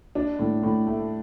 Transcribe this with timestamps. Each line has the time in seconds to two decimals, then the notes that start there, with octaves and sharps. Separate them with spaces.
0.15 D4
0.39 A2
0.63 A2
0.87 A3